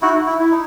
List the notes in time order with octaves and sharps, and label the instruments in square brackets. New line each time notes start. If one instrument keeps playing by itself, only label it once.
[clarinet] D#4 [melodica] E4 F#4
[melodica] E4
[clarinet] E4
[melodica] D#4